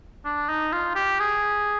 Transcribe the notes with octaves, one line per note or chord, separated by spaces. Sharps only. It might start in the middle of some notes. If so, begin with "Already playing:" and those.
D4
D#4
F4
G4
G#4